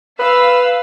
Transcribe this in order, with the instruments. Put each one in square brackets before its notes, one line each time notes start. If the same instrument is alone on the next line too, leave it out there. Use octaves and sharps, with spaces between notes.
[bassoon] B4 [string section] F5 E6